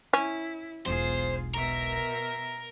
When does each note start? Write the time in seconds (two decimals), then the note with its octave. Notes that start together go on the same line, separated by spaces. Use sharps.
0.13 C#4 E4
0.86 E1 B1 F4 G#4 C5
1.55 B2 A#4 E5